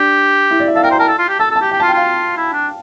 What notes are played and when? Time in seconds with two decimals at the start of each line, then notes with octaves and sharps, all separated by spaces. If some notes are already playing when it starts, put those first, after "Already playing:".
Already playing: D4 G4
0.51 E4
0.60 D5
0.68 E5
0.75 A4 F5
0.83 A#4 G5
0.91 C5 A#5
0.99 A#4 A5
1.08 A4
1.18 F4
1.28 G4
1.39 A4 A5
1.51 A4 A5
1.61 G4
1.71 G4 G5
1.80 F4 A5
1.88 G5
1.94 F4 F5
2.37 E4
2.53 D4